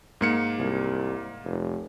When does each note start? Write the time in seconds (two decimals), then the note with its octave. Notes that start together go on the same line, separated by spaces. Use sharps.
0.21 G#2 A#3 C#7
0.58 C2
1.45 F1